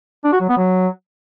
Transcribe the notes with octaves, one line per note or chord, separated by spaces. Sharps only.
D4
F#4
F#3
B3
F#3